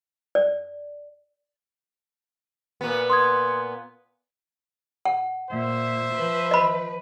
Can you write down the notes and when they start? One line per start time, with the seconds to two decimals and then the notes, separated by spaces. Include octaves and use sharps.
0.35 D5
2.81 A#2 B3
3.10 C6 D#6 G#6
5.05 F#5
5.51 A#2 C5 E5
6.13 F3 B4
6.51 D#5 B5